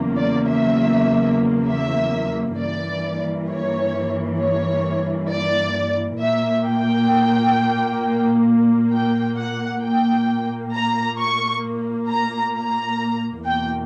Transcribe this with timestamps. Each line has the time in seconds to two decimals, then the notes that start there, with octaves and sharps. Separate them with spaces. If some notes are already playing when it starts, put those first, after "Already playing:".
Already playing: E2 C#3 F#3 A#3
0.17 D5
0.48 E5
1.68 E5
2.58 G2 E3 A#3 D5
3.49 C#5
4.40 C#5
5.30 D5
6.20 A#2 A#3 E5
6.66 G5
8.92 G5
9.37 F#5
9.82 A#2 A#3 G5
10.73 A#5
11.19 C#6
12.09 A#5
12.54 A#5
13.44 E2 B2 A#3 G5